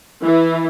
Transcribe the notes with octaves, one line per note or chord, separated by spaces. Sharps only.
E3